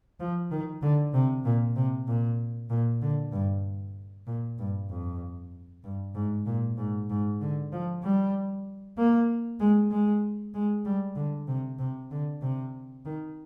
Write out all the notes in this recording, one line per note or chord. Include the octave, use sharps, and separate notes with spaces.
F3
D#3
D3
C3
A#2
C3
A#2
A#2
D3
G2
A#2
G2
F2
G2
G#2
A#2
G#2
G#2
D3
F3
G3
A#3
G#3
G#3
G#3
G3
D3
C3
C3
D3
C3
D#3